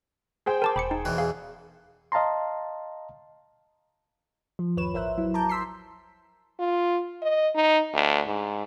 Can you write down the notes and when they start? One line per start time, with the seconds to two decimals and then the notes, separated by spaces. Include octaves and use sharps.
0.46 G#4 C5 G5
0.62 A#4 A5 D6
0.76 E1 B5 D6 C#7
0.91 D#4
1.05 E2 B2 E3
1.18 G#4 F5
2.12 D#5 F5 A5 A#5 C6
4.59 F3
4.77 G1 D#2 B4 C#5 E7
4.94 A1 A#4 C5 E5 F#6
5.18 F#3 E4
5.34 A5 A#5 D6 G6
5.49 C6 E6 B6 C7
6.60 F4
7.22 D#5
7.55 D#4
7.94 D2
8.27 G#2